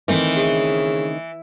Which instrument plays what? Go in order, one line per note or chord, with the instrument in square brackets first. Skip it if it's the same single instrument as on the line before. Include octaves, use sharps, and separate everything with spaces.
[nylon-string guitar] D#3 A3 C4 [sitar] E3
[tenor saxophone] C#3